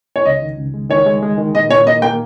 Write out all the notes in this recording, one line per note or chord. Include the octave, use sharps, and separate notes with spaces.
C#5
C#2 D#5
D#3
C#2
G#3
D#3 C#5
G#3
G#3
D#3
A#2 D#5
A#2 C#5
A#3 D#5
A#3 G5